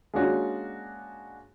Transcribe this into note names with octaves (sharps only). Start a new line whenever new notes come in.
G#3 A#3 C#4 D4 F#4